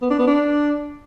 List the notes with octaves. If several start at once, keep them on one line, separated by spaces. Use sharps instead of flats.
B3
D4
B3
D4